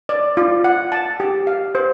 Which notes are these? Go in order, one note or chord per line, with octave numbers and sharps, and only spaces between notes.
D5
F4
F#5
A5
G4
F5
C5